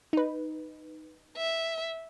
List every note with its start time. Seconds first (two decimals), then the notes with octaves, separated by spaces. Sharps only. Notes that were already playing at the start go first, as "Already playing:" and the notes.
0.13 D#4 B4
1.37 E5